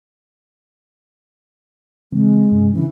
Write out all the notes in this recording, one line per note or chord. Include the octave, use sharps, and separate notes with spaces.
C#3 E3 G#3 C4
G2 C3 C#4
C#3 E3 C#4 D4